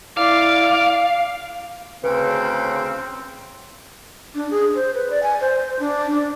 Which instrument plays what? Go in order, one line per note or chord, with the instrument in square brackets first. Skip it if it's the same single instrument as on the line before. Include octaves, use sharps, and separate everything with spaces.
[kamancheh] E4 D5 [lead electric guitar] F5 [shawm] D6
[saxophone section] D2 C#3 [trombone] C4 [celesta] B4
[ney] D4
G#4
C5
B4
D5
G#5
C5
D4
D4